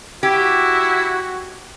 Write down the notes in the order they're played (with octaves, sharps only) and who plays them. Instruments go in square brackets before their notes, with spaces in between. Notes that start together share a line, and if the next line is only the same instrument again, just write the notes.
[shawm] E4 [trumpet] F#4 [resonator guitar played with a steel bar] G4